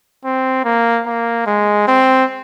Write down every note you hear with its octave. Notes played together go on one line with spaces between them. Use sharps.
C4
A#3
A#3
G#3
C4